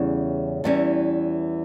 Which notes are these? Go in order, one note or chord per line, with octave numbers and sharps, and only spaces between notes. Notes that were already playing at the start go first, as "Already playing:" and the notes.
Already playing: E2 C#3 G3 C#4
E2 E3 G3 C#4